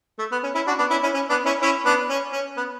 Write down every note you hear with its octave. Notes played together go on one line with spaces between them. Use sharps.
A3
B3
C#4
C#4 E4
D4 F#4
B3 D4
C#4 E4
C#4 E4
C#4
B3 D4
C#4 E4
C#4 E4
B3 D4
C#4
C#4
B3